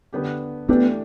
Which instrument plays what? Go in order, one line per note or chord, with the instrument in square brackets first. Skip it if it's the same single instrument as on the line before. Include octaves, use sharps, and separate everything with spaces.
[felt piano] D3 B3 G4
[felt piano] E3 A3 D4 G4 [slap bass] B3